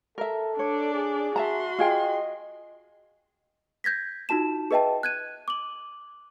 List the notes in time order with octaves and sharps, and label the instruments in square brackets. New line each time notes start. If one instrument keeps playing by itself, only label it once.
[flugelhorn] A4 [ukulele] A#4 E5
[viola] D4 D5 [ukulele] C#5
[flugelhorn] G#4
[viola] F#4 C6 [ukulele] E5 A5 A#5
[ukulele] F4 G#4 G5 [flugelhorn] D#5
[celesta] G6 G#6 A#6 B6
D#4 F4 F#4 A5 E7
G#4 B4 D#5 E5 G5 A5
F#6 G#6 D#7
D6 F#7